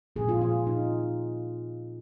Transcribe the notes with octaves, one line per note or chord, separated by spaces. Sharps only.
A#2 F3 C4 G#4
F4
F4
D#4